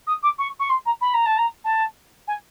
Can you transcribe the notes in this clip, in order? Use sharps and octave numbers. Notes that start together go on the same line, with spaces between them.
D#6
D6
C#6
C#6
C6
A#5
B5
A#5
A5
A#5
A5
G#5